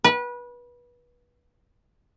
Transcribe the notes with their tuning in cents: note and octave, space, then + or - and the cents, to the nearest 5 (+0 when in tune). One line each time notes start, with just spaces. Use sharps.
B4 -25